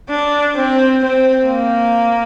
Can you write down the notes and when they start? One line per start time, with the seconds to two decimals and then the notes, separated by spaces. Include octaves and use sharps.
0.10 D4
0.55 C4
1.02 C4
1.47 A#3